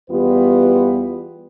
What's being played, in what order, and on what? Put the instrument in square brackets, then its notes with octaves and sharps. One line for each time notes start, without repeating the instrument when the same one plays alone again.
[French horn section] E2 G3 B3 F4 G4 B4